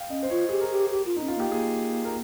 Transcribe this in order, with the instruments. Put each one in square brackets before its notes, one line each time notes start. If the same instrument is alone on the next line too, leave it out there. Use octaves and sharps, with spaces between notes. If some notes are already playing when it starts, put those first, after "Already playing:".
Already playing: [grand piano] F5 G5
[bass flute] C#4 [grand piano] D#5
[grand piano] C5
[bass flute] F4 [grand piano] C#5
[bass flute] G4 [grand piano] G#4
[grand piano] A#4
[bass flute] G4
G4
F4
[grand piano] D#4
[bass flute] C#4
[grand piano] F4
[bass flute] A#3 [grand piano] G4
[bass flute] A#3 [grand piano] G#4
[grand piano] A#4